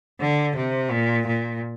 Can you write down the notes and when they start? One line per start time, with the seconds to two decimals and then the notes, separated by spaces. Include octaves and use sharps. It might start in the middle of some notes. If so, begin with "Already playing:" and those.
0.20 D3
0.56 C3
0.91 A#2
1.27 A#2